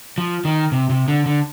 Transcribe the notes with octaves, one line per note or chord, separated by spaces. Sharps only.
F3
D#3
C3
C3
D3
D3